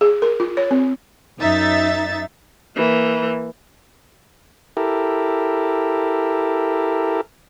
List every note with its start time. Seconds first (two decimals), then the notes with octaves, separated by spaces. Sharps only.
0.01 G#4
0.22 A#4
0.40 F4
0.57 C#5
0.71 C4
1.39 F#2 D#4 E5 A6
2.75 E3 A#3
4.77 E4 G4 A4 A#4